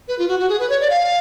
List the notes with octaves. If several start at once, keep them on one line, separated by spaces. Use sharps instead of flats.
B4
F4
F#4
F#4
G#4
B4
C#5
D5
F5